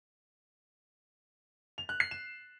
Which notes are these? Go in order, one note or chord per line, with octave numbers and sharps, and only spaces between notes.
F7
F#6
C7
E7